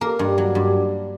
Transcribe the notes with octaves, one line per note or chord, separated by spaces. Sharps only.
A#3 A#4
G2
F#3
G2